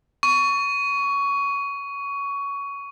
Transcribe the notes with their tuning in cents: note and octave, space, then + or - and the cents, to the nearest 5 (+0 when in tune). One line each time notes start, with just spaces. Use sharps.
C#6 +20